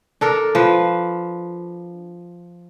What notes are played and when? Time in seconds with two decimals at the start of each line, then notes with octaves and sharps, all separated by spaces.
0.21 D4 A4 A#4
0.55 F3 B4